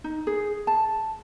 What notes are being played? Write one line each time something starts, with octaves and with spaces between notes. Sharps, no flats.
D#4
G#4
A5